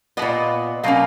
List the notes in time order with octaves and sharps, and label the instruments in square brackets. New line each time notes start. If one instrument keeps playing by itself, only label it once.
[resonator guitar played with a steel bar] G#3 B3 D#5
A#2
B2 F#3 A#3 C#4 F5